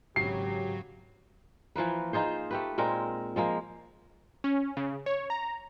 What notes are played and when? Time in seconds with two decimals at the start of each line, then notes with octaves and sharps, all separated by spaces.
0.16 G#1 C#3 F#3 G4 C7
1.76 E3 F3 A#3 B4
2.13 D#4 F4 G#4 C5
2.51 A3 G4 B4
2.78 A#2 G#3 C4 A#4
3.36 F3 G#3 A#3
4.44 C#4
4.77 C#3
5.06 C#5
5.30 A#5